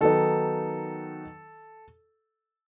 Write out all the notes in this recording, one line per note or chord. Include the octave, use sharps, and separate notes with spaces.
D#3 F#3 B3 D#4 A4